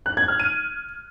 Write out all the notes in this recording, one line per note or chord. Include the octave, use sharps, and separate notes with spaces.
F#6
G#6
F6
D#7